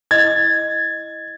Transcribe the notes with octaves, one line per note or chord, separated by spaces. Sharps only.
E4 D#5 G#6 A6